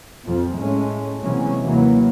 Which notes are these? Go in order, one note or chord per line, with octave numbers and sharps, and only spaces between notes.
F2 F3
A2 G#3 A3 C#4
C3 E3 F#3 G#3 A#3 C#4
D#2 C3 E3 F#3 A#3